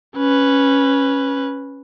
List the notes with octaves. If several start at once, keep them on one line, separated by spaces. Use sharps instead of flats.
C#4 B4